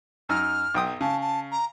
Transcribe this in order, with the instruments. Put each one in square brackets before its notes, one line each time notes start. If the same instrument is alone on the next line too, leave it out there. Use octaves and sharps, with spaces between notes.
[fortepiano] F#2 D#4 E6 [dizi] F6
[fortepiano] B1 G5 D#6
[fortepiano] C#3 [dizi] A5
[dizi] A5
A#5